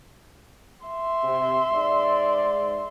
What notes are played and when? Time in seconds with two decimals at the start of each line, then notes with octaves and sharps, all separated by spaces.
0.86 E5 C6
1.23 C3
1.72 G#2 D5